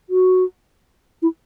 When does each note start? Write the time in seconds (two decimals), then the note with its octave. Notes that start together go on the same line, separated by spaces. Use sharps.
0.10 F#4
1.22 E4